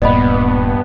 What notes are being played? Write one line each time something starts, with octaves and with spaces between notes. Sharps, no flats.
D1 G2 A#2 B3 D5 D#5 B5